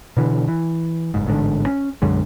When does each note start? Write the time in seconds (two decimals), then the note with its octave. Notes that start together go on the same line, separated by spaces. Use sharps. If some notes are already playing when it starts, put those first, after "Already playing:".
0.17 B2 D3 E3
0.48 E3
1.14 F#1 G#2
1.26 A1 G#2 D3
1.66 C#4
2.02 B1 F#2 D3 G#3